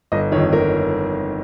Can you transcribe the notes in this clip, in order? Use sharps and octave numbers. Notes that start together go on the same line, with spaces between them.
G1 D#5
F2 D#3 C#5
G1 A#4